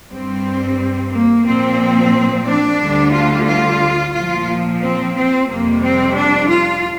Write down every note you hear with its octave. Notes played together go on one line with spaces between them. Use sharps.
G2 G3 C4
A#3
A#2 F3 C4
D4
D2 D3 G3
F4
F4
A#2 F3 F4
C4
C4
F2 C3 G3 A#3
C4
D4
F4